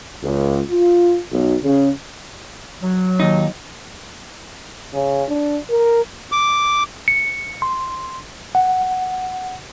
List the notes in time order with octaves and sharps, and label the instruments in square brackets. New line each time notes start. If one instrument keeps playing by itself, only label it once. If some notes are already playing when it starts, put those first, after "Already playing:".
[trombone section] C#2
F4
B1
C#3
[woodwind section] F#3
[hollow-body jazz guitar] D#2 D#4
[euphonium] C#3
D4
A#4
[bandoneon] D6
[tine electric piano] C#7
C6
F#5